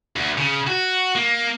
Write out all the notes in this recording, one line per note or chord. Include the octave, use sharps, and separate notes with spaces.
D2
C#3
F#4
A#3